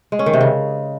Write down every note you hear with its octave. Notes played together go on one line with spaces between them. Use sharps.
G#3
C#4
D#3
C3
C#3